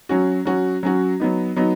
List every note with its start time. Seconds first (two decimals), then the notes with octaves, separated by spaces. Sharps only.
0.09 F#3 C#4 F#4
0.45 F#3 C#4 F#4
0.83 F#3 C#4 F#4
1.20 F#3 B3 D#4
1.56 F#3 B3 D#4